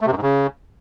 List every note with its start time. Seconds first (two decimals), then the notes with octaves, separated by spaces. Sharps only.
0.01 A3
0.06 C3
0.11 F#2
0.17 G#2
0.22 C#3